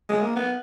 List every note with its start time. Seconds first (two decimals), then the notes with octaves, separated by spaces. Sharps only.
0.09 G#3
0.22 A#3
0.36 B3